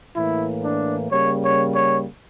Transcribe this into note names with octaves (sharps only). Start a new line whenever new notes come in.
A2 E3 A#3 E4
D4
C#3 G3 A#3 C#5
C#5
C#5